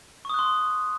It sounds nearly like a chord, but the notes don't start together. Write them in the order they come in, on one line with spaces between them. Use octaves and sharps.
C#6 D#6 F#6 C6